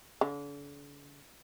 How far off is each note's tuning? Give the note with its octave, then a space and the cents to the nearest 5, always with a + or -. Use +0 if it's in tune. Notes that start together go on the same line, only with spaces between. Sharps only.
D3 -45